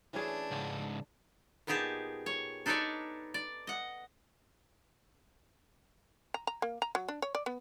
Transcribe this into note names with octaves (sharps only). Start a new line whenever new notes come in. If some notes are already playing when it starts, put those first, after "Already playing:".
E3 A3 C#4 D4 G#4
C#2 G#2
A#2 B3 D#4 G4 G#4 A5
C#5
D4 D#4 A4 B4 C#5 D5
D5
D#5 F#5
A#5
A#5
A#3
A#5
F#3
D4
C#5
D5
B3